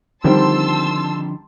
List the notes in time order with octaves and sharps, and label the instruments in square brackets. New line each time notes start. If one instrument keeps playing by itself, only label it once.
[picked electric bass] D3 F3 [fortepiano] D#3 G3 C4 [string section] A5 C6 E6